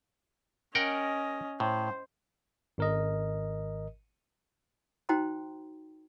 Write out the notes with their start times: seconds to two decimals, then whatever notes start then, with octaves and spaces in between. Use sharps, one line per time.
0.75 C#4 A#4 D#5 F#5 G5
1.60 A2 C5
2.78 G#1 A#4 D#5
5.09 D#4 F#4 C5 G5 A#5 C6